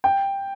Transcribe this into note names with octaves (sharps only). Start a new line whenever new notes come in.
G5